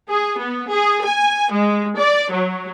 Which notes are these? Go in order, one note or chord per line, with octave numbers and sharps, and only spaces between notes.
G#4
B3
G#4
G#5
G#3
D5
F#3